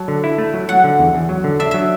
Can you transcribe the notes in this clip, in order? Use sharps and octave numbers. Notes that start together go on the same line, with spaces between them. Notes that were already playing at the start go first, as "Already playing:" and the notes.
Already playing: F#3 A5
D3
E4
A3
F#3
F#3 F#5
D3
E2
E2
F#3
D3
D4 E5
F#3 E5